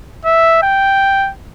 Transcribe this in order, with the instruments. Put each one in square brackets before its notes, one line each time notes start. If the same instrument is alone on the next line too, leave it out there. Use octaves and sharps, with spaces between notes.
[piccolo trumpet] E5
G5